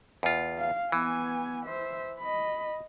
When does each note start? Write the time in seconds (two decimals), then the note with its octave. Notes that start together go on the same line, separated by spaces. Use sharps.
0.23 E2 F4
0.58 F5
0.92 E3 B3 G#5
1.65 C5 E5
2.20 D#5 B5